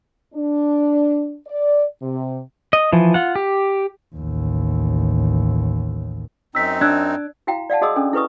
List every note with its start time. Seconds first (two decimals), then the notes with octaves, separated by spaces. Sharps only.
0.34 D4
1.47 D5
2.02 C3
2.73 D#5
2.93 E3 F3
3.14 F4 F#5
3.36 G4
4.16 A1 D#2
6.55 F#2 C4 D#4 E6 B6
6.81 D4 E6 F#6 G#6
7.47 E4 F#4 F5 G5 A#5
7.70 D5 F5 F#5 A5
7.81 F#4 G#4 D#5 C6 D#6 E6
7.96 C#4 D4 A4
8.13 E4 A4 B4 C#6 D#6